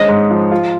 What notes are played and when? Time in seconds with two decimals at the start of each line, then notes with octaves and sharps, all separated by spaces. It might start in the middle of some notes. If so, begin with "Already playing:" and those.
Already playing: G#3 C#4 D#5
0.08 G#2
0.30 F3
0.51 F4